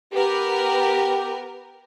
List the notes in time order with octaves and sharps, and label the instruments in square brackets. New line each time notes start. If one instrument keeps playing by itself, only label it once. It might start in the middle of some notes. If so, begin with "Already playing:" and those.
[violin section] B3 A#4 B4 [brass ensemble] G4